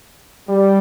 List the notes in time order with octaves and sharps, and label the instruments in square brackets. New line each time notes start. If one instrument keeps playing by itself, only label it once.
[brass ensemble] G3